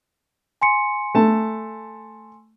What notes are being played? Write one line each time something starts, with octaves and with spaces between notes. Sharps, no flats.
G#5 C6 C#7
A3 A5